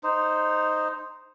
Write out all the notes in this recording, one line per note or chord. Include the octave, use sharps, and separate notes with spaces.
D#4 C5